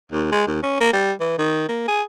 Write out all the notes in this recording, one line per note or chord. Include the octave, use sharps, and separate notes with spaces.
D#2
G#3
D#2
C#4
A#3
G3
E3
D#3
A#3
G#4